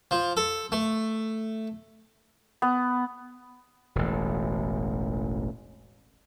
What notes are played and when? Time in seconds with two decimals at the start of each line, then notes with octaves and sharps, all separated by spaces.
0.11 F3
0.37 A4
0.72 A3
2.62 B3
3.95 E1 A1